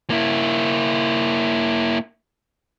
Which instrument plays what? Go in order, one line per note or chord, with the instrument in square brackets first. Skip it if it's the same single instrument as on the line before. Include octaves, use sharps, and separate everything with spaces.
[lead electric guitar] A#3 E4